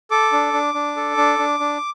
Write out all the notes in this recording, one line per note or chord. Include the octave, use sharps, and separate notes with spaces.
A4 D6
D4
D4
D4
A4
D4
D4
D4